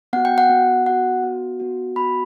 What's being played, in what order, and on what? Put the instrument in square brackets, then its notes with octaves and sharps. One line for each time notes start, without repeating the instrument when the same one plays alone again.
[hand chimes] B3 F#4 F#5
G5
F#5
B3 F#4
B3 F#4 F#5
B3 F#4
B3 F#4
B3 F#4 B5